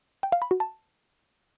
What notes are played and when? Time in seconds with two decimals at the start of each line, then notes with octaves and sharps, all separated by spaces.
0.23 G5
0.32 F5
0.42 B5
0.51 F#4
0.60 A5